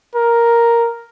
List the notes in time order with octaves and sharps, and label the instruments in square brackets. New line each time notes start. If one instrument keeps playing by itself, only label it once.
[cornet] A#4